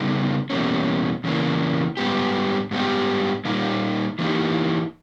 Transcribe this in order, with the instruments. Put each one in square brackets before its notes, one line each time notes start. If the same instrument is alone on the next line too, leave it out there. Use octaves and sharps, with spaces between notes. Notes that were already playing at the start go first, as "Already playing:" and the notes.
Already playing: [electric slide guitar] C#3 G3 B3 D#4
E2 B2 G3 A#3 C#4
E2 C#3 E3 A#3
G#2 G3 B3 G4
G#2 G3 B3 G4
A#2 G3 A#3 D#4
E3 A#3 D#4 G4